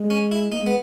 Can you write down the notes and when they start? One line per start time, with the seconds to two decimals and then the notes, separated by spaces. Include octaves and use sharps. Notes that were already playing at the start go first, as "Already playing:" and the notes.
Already playing: G#3
0.10 C#4
0.31 E4
0.51 A#3 D#4
0.60 G#3
0.66 B3